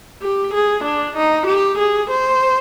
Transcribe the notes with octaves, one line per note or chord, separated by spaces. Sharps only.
G4
G#4
D4
D#4
G4
G#4
C5